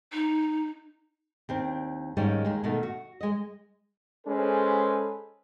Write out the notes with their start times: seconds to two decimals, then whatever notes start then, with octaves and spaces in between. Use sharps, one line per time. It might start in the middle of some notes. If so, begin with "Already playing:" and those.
0.13 D#4
1.49 D#2 C4 D4
2.17 G#2 D#3 G3 G#3 A#3 C#4
2.45 D#2 G#3
2.64 B2 D#3 A3
2.83 F#4
3.21 G#3 D#5
4.27 G#3 C#4 G#4 A4 B4 C5